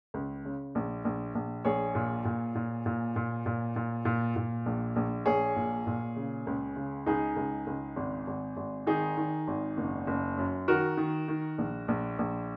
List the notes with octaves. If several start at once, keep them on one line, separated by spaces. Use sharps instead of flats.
C#2
C#3
A#1
A#1
A#1
A#1 G#4 C#5
A#2
A#2
A#2
A#2
A#2
A#2
A#2
A#2
A#2
A#1
A#1
A#1 G#4 C#5
A#2
A#2
C#3
C#2
C#3
C#2 D#4 G#4
C#2
C#2
G#1
G#1
G#1
D#3 D#4 G#4
D#3
G#1
F#1
F#1
F#2
D#3 F#4 A#4
D#3
D#3
A#1
A#1
A#1